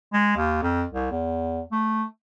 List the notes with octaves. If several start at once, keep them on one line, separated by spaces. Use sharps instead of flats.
G#3
D#2
F2
C2
E2
A3